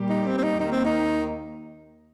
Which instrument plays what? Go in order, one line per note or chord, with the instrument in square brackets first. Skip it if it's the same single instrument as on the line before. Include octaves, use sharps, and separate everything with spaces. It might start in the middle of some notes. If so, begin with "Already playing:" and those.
Already playing: [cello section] A#2 G3 A#3 G4
[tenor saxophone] D#4
C4
C4
D#4
[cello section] D#2 D#3 A#3 [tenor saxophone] D#4
[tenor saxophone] C4
D#4